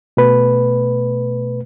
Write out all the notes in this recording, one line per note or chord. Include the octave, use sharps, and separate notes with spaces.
B2 A3 B4